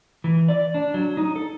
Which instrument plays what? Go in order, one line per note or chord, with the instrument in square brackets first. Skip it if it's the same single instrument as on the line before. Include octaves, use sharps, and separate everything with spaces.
[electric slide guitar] E3
D5
D4
F#3
D#4
A4